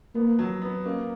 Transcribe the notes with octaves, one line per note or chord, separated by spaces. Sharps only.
A#3 B3
F#3
B3
A#3 C#4